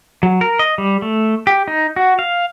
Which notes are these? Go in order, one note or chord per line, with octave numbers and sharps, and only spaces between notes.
F#3
A#4
D#5
G3
A3
G4
D#4
F#4
F5